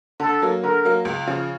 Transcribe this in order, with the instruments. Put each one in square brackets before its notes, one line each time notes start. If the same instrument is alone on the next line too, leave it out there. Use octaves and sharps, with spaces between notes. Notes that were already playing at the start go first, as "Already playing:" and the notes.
[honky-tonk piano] D3 [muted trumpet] A4
[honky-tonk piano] F#3 A#3
[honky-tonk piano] D3 [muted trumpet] A#4
[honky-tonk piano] F#3 A#3
C#2
C#3 F3